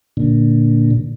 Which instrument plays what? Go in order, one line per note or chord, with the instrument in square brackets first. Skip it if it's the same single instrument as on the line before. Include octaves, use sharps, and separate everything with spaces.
[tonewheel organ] A#2 D3